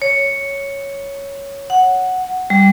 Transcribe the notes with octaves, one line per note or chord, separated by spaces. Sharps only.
C#5
F#5
G3